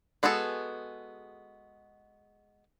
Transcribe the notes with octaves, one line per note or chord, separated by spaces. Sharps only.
G#3 B3 F#4 G#4 A4